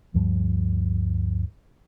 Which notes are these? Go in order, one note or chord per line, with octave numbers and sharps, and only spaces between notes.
D2 G2 F3 G3